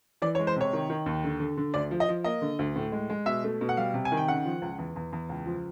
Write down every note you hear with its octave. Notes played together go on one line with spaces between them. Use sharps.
E3 D5
C#5
G#3
C5
C3 C#5
D#3
D#3
D#2
D3
D3
D3
D2 D5
F3
D#5
F3
A#3 D#5
D3
D2
A2
G#3
G#3
B2 E5
A3
B2
F#5
G3 F5
C3
G#5
D#3
G5
C#3 F#5
F3
C#2
E2
E2
E2
C#2
F3